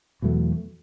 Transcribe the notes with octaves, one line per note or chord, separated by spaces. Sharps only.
E2 B2 F#3 A3